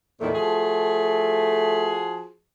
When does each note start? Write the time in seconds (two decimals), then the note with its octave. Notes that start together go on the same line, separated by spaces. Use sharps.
0.21 E2 A#2 D#3 A3
0.34 F3 F#4 G#4